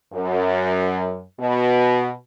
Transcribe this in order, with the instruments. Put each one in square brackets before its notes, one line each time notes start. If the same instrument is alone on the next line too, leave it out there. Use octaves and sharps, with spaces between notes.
[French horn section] F#2
B2